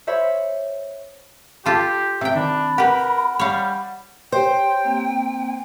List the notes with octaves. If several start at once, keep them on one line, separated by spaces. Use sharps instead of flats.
C5 C#5 E5 B5
F4 G4 A4 C6
C3 E5 G5
D#3 D4 B5
G4 A#4 B4 F#5
G3 C#5 F5
G4 C5 C#5 G5
A#3 C4